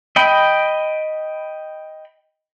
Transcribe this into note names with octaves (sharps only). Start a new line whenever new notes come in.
D#5 G5 B5